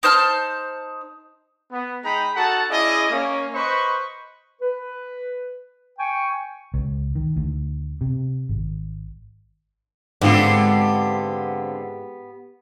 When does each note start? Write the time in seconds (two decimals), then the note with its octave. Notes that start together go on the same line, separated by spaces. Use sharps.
0.03 D#4 C5 A5 F6
1.71 B3
2.04 G#3 D#4 G#4 G5 A#5 B5
2.36 D#4 F#4 A4 F#5 A5
2.70 C#4 E4 G#4 D5 D#5
3.10 A#3 C#4
3.54 B4 C5 D#5 B5 C#6
4.62 B4
5.99 G5 G#5 C#6
6.74 C#2
7.15 D#3
7.36 D2
8.01 C3
8.49 G#1
10.21 G#2 D3 B3 C4 F4 G4